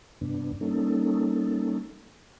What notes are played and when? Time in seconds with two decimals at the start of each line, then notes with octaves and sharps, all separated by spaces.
0.21 G2 C3 B3 D4
0.61 G3 A#3 C#4 D#4 A4